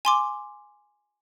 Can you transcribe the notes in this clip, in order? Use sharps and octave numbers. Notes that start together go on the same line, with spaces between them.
G#5 C6 D6